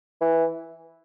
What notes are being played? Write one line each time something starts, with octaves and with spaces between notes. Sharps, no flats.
E3